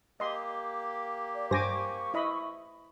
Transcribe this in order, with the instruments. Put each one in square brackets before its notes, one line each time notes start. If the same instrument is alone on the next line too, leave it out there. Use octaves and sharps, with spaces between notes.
[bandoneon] A#3 G4 [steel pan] D#5 C6
[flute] D5
[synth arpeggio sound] G2 A#6 [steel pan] C5 G#5 D6 [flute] C#6
[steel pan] E4 D#5 B5